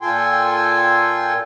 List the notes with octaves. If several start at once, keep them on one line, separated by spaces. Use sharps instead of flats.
A#2 F4 A4 G5 G#5 C6